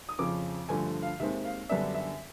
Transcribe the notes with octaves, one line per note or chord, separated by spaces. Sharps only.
D#6
F2 C#3 F3 D6
G2 D3 F3 A3 G#5
F5
D#2 D#3 G#3 C4 E5
F5
F#2 D3 G3 B3 D4 E5
E5